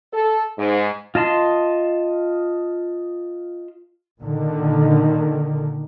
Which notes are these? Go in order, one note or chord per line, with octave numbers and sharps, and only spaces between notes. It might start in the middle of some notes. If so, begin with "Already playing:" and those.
A4
G#2
F4 D#5 A5 C6
A#2 D3 D#3